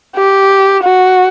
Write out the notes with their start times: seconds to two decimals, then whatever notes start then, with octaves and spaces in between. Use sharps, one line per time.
0.16 G4
0.83 F#4